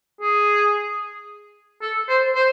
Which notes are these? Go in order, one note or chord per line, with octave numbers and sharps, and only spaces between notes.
G#4
A4
C5
C5